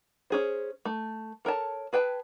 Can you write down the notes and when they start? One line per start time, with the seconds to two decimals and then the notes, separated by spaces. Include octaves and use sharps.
0.30 C#4 G#4 C5
0.85 A3
1.45 A4 A#4 C#5 A5
1.93 G#4 B4 G5 A5